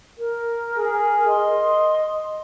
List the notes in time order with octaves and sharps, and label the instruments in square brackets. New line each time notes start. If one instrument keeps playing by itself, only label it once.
[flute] A#4
[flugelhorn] G#4
[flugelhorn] D#5 [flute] C6